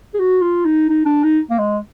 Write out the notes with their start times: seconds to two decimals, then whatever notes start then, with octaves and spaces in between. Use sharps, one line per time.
0.14 G#4
0.19 F#4
0.41 F4
0.65 D#4
0.89 D#4
1.06 D4
1.24 D#4
1.50 A#3
1.59 G#3